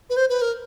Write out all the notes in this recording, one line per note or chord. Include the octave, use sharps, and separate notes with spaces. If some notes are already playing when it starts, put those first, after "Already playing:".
B4
C5
B4
A#4